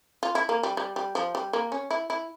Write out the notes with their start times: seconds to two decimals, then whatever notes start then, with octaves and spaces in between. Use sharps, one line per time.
0.23 F4
0.35 E4
0.49 A#3
0.63 G3
0.77 G3
0.96 G3
1.15 F3
1.35 G3
1.53 A#3
1.72 C#4
1.91 E4
2.10 E4